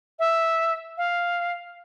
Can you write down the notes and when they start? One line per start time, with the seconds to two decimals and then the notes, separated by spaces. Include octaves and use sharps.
0.19 E5
0.98 F5